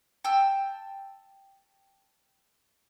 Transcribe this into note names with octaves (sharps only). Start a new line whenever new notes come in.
G5 A5 E6